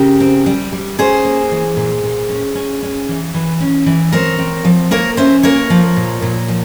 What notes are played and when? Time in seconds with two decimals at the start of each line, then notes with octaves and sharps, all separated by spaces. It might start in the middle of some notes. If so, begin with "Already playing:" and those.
Already playing: C#3 G4 A#4
0.20 C4
0.46 G3
0.72 G3
0.99 C#4 G#4 C5
1.25 A#3
1.51 E3
1.77 A#2
2.04 A#2
2.29 C#4
2.55 C#4
2.82 C#4
3.09 E3
3.34 E3
3.61 C#4
3.86 E3
4.12 C4 A#4 C#5
4.39 C4
4.65 F3
4.91 A#3 A#4 C#5
5.17 C#4 C5 E5
5.43 A#3 A#4 C#5
5.70 F3
5.97 A#2
6.22 A#2
6.48 F3